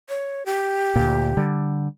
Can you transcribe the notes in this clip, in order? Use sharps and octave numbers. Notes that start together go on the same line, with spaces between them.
C#5
G4
D2 A#2
D3 G3